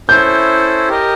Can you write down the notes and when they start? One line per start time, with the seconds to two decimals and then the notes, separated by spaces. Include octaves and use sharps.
0.09 C#4 E4 A4 C5 G6
0.88 G4 A#4 D#5